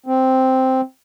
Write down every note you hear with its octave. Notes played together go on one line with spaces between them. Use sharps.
C4